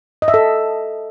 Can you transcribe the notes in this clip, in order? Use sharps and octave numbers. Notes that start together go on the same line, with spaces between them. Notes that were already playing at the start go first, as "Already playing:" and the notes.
D#5
E5
A4